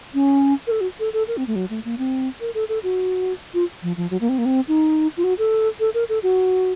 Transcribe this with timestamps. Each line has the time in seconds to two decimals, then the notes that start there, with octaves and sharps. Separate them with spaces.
0.14 C#4
0.67 A#4
0.71 A4
0.81 F#4
1.00 A4
1.13 A4
1.28 A#4
1.37 C4
1.47 A3
1.56 F#3
1.70 A3
1.85 A#3
1.98 C4
2.41 A#4
2.55 A4
2.69 A4
2.83 F#4
3.54 F4
3.83 F3
3.97 F3
4.10 F#3
4.21 A#3
4.29 C4
4.38 A#3
4.45 C4
4.68 D#4
5.17 F4
5.24 F#4
5.38 A4
5.80 A4
5.94 A#4
6.09 A4
6.23 F#4